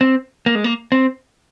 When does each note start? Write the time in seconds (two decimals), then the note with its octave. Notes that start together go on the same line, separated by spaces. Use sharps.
0.01 C4
0.46 A#3
0.55 G#3
0.64 A#3
0.92 C4